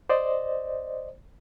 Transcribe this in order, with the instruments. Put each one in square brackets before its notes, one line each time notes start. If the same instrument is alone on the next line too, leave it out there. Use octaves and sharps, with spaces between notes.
[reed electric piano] C5 D5 D#5